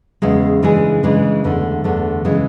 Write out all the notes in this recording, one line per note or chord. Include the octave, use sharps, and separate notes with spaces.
E2 C#3 G#3
C#3 E3 G#3 D4 G#4
C#3 E3 G#3 D4 G#4
E2 D3 A3 D4
E2 D3 A3 D4
C#3 E3 G#3